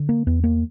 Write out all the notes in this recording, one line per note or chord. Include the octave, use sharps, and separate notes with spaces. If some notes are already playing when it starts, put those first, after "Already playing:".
Already playing: D3
A#3
E2 B3
A#3